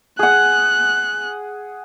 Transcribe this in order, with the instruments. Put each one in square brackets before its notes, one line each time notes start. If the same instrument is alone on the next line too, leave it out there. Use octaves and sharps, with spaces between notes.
[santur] G#4 F#5 [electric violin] F#6